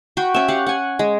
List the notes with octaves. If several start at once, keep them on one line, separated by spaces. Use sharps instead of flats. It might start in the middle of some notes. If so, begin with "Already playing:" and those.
F#4 G5 B5
C#4 E5
G4 F5 F#5
F#5 G#5
G#3